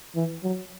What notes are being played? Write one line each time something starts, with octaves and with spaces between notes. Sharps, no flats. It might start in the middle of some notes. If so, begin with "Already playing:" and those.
E3
F#3